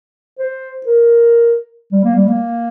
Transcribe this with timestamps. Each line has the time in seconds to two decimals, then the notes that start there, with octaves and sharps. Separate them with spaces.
0.39 C5
0.86 A#4
1.92 G3
2.04 A#3
2.16 G3
2.27 A#3